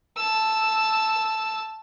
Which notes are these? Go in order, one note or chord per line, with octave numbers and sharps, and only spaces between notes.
A5 E6